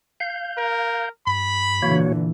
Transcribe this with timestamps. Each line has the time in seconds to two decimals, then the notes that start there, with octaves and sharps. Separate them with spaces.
0.20 F5 G6
0.57 A#4
1.27 G2 B5
1.82 A#2 D3 E3 A#3 F#4 C#5